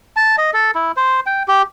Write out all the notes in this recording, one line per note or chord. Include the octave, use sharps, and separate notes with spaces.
A5
D#5
A4
E4
C5
G5
G4